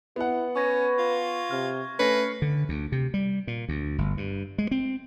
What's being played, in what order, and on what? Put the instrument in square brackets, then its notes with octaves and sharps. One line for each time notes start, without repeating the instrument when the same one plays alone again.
[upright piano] B3 F#5 [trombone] E4
[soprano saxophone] C#4 [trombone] B4 [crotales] C#6 G#6 A#6
[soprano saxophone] F4
[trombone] C3 [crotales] F6
[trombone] A3 [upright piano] C#4 [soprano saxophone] B4 [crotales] A#6 C7 C#7
[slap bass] D3
D2
C3
G3
A#2
D2
G1
G2
G#3
C4